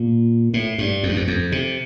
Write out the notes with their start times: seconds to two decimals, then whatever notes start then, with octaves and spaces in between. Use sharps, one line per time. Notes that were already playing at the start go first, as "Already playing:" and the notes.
Already playing: A#2
0.54 A2
0.78 G2
1.03 F2
1.09 G2
1.16 F2
1.28 F2
1.52 C3